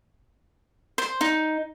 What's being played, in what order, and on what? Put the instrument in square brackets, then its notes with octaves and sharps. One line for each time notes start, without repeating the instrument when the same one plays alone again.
[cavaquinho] C5
D#4